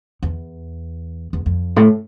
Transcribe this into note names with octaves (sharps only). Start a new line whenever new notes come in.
E2
E2
F2
A2